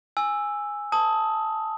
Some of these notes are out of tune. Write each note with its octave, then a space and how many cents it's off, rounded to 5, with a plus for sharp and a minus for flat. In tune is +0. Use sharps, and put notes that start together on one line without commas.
G#5 -5 E6 +0
A5 +0 D#6 +15